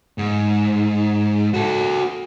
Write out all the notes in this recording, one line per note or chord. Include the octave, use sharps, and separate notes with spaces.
G#2
F#4 A4